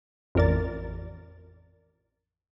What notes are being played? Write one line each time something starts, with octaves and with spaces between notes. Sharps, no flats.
A1 F2 A#4 D5 A6